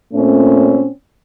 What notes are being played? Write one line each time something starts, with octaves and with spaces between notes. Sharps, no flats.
A#2 A3 C4 C#4